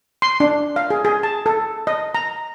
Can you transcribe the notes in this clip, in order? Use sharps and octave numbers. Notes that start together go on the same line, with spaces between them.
C6
D4
F5
G#4
G#4
A5
A4
D#5
A#5